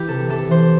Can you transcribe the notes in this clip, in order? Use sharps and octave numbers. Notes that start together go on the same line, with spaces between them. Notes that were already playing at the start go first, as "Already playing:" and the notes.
Already playing: E3 E4 G4
C3 A4
E3 A4
E3 C5